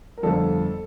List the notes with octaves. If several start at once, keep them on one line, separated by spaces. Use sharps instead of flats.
A#4
G1 F2 D3 F3 A4